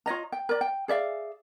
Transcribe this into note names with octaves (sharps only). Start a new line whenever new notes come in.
F4 C#5 D#5 A#5
G5
A#4 D5
G5
G#4 D5 E5 F5